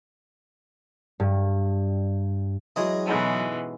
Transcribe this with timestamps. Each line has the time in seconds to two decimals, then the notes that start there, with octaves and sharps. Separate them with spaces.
1.20 G2
2.76 E3 F#3 G#3 C#4 G#4 D#5
3.07 G#2 B2 E3 G#3 B3 A4